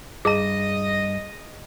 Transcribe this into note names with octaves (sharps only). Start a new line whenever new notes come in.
G2 G#4 D#5 A#5